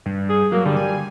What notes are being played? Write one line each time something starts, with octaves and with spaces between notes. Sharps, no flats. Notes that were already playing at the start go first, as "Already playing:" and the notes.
G2
G#4
F#3 A#3
D3 G3
G#5